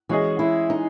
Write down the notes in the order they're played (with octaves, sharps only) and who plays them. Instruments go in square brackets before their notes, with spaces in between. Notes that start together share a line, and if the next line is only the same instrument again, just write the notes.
[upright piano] E3 G#3 C#4 G#4 D#5 [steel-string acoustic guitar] F#4
[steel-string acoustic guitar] E4
D#4